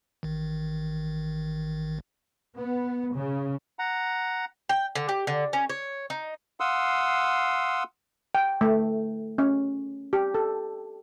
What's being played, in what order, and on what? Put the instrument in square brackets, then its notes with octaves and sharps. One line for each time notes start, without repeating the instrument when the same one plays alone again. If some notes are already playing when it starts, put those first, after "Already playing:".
[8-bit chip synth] A1 D#3
[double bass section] B3
C#3
[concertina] F#5 A#5
[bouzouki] G5
D3
G4
D3
C#4
C#5
D#4
[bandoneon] F5 F#5 C6 D#6 E6
[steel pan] G5
A3
C#4
G4
A4